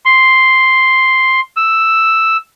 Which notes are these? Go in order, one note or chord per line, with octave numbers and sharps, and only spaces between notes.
C6
E6